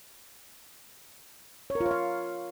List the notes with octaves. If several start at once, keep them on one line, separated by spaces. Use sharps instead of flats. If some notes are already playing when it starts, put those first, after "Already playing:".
C#5
A#4
F4
C#5
F5